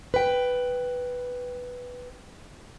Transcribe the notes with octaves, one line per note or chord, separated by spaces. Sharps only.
B4 G5